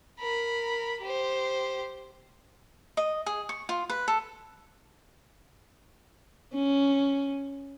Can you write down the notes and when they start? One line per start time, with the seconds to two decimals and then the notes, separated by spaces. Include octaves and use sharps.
0.20 A#4 B5
1.01 G4 C5
2.97 D#5
3.26 G#4
3.49 C#6
3.69 F4
3.90 B4
4.08 A4
6.54 C#4